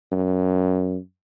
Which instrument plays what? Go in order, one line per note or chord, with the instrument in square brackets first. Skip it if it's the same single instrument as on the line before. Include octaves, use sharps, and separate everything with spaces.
[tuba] F#2